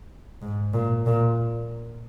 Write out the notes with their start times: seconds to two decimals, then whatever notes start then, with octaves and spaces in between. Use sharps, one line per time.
0.42 G#2
0.73 A#2
1.06 A#2